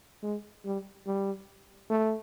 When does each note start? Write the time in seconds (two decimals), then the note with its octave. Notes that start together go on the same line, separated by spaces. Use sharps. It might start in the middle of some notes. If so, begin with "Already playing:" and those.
0.23 G#3
0.65 G3
1.07 G3
1.90 A3